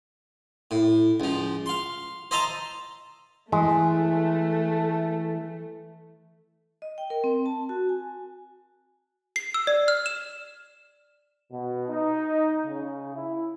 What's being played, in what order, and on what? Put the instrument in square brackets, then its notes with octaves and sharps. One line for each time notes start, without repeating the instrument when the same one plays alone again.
[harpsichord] A2
C#2 F3
F5 C6
C5 D#5 E5 A5 A#5
[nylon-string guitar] E3 [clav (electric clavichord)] G#3 [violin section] A3
[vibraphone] D#5
G5
A#4
C4
A5
F#4
G#5
[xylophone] C7
E6
D5
F6
E7
[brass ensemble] B2
D#4
C#3
E4